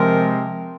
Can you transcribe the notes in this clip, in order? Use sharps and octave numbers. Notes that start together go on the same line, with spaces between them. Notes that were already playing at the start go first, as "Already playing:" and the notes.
Already playing: C3 F3 G#3 C4 A#4